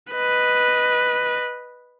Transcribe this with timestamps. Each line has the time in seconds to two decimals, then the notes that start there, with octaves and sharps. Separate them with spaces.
0.12 B4 D#5